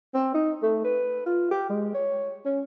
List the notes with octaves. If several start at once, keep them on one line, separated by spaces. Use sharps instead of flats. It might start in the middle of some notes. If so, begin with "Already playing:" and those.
C4
D#4
A3
B4
F4
G4
G#3
C#5
C#4